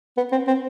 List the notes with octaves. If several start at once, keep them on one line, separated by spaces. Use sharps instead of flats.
B3
C4
C4